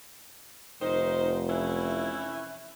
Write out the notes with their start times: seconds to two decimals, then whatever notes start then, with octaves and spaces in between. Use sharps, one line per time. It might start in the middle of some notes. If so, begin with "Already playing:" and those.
0.81 F1 D#3 D#4 C5
1.49 E3 C#4 E4